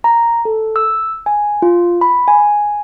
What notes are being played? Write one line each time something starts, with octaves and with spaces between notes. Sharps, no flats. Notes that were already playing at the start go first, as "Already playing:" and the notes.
A#5
A4
E6
G#5
F4
B5
G#5